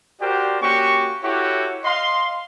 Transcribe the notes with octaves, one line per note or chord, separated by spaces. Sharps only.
F#4 G4 A#4 C5 D5
A#3 C#4 F#4 G4 C#6
E4 F#4 G4 A4 C#5
D#5 F5 C6